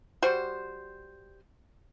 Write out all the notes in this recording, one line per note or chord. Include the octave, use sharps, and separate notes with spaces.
G3 F#4 C5